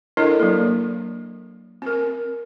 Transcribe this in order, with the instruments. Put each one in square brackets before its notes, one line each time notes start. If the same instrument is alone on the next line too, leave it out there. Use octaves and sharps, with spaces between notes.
[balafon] D4 E4 A4 A#4 C#5 D#5
F#3 A#3
C4 A#4